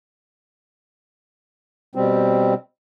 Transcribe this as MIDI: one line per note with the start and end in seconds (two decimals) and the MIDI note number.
1.95 2.54 47
1.95 2.54 55
1.95 2.54 60